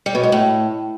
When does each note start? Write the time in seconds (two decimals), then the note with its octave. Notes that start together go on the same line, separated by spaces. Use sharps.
0.06 G3
0.15 B2
0.24 G#2
0.32 A2